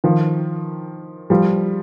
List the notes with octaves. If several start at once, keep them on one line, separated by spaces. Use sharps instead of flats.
D#3 F3
F3 G3